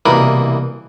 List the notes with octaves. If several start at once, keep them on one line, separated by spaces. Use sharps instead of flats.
C2 B2 E3 A#3 A#4 B5